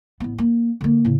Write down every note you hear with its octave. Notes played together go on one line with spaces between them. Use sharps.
A1 B3
A#3
D3 A#3
A2 C#3